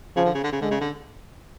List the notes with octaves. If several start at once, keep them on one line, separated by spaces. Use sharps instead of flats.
C#3 F3
D3
C#3
D3
C#3
D3 G#3
C#3
D3